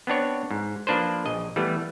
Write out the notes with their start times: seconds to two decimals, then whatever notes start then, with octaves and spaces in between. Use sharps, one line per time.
0.07 B3 C4 D4 C#5
0.51 G#2
0.87 F3 A#3 D4 B4 C5
1.26 A#1 D#5
1.56 E3 G3 A3 B3